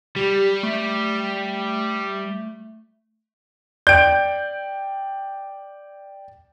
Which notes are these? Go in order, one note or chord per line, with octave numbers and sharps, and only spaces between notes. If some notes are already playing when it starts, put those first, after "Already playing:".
G3 G4
A3
D5 G5 G6 D7